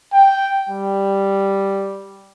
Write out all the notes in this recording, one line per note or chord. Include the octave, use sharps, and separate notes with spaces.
G5
G3